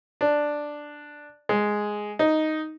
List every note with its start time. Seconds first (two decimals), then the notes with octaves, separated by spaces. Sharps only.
0.21 D4
1.49 G#3
2.19 D#4